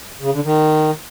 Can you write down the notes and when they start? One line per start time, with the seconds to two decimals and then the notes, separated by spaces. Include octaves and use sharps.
0.20 C#3
0.32 D3
0.44 D#3